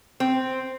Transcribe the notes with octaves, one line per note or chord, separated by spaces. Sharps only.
C4